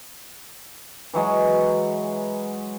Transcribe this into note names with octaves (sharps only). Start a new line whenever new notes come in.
E3 F#3 G#3